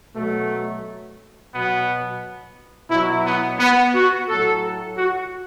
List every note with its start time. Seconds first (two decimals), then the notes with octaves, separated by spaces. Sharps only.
0.15 B2 F#3 A3
1.53 B2 F#3 B3
2.90 B2 F#3 E4
3.25 B3
3.60 B3
3.94 F#4
4.28 A2 F#3 A4
4.96 F#4